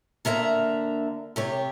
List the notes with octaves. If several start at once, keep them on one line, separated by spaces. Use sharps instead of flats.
D3 A#3 E5 F5 A#5
C3 G4 C#5